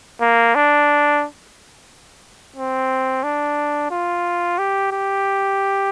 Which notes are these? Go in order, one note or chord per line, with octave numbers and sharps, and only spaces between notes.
A#3
D4
C4
D4
F4
G4
G4